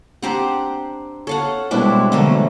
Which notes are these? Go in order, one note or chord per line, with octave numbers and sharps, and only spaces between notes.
C4 D4 G4 C5 F#5 A#5
A4 C#5 F5 F#5 A5
B2 G3 G#3 C4 D4 E4 B4 A5
D3 E3 F#3 A3 A#3